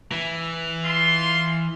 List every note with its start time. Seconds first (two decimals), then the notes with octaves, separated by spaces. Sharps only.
0.12 E3
0.85 F4 C6